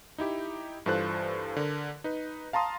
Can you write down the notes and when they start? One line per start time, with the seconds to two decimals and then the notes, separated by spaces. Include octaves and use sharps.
0.18 D#4 E4 G4
0.86 G2 E3 F4 A4 C5 F#6
1.56 D3 A#4
2.04 D#4 B4
2.53 F5 A5 A#5 C6 D#6